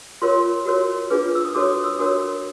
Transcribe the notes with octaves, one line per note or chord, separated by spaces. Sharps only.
F4 A#4 C#5 C6
F#4 A#4 C#5
D4 F4 G#4 B4
E6
D#6
D4 F#4 A4 C#5 D6
D#6
E6
D4 F#4 A#4 C#5 D#6